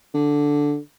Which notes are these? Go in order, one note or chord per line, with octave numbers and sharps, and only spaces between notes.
D3